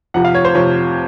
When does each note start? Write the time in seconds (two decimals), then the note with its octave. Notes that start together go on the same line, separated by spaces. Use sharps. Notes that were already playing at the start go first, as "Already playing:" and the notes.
0.14 F2 C3 F3 F#5
0.24 F5
0.35 C#5
0.45 C5
0.55 F2 C3 F3 C#5